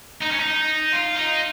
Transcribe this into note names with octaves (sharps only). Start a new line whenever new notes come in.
D#4
C#4
D#4
F4
D#4